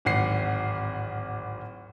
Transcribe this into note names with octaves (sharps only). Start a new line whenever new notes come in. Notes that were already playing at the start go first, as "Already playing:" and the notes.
D1 G#1 F#5 C7